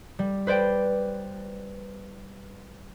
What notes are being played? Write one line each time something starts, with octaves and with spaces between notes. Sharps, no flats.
G3
B4 C5 D5 G5